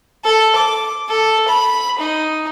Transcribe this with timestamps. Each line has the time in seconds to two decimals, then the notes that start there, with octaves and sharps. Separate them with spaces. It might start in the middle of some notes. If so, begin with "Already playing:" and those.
0.25 A4
0.55 D6
1.09 A4
1.48 B5
1.98 D#4